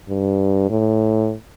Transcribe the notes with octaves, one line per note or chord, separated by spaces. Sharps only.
G2
A2